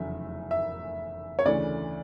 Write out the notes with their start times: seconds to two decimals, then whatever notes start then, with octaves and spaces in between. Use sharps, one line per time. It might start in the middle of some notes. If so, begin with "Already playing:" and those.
Already playing: F1 E2 C#3 F#3 A3 E5
0.51 E5
1.39 C#5
1.45 D2 C#3 E3 A3 D5